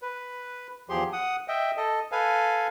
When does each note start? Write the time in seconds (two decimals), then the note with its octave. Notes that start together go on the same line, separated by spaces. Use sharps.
0.02 B4
0.89 E2 F3 G4 G#4 C6
1.13 F#5 D#6
1.48 D#5 E5 G5
1.77 A4 D#5
2.12 A4 B4 F5 G#5